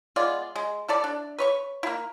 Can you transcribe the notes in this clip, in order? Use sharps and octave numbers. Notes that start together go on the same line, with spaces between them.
G#3 B3 F4 D5
G#3
E4 A4 D5
D4
B4 C#5 C#6
A#3 E4